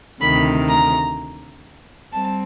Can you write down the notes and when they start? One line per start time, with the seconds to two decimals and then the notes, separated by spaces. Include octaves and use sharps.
0.21 D2 C3 D#3 B5
0.69 A#5
2.12 G3 C4 A5